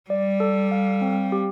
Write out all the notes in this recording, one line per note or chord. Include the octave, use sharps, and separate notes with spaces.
G3 D5
A4
F5
C4
G4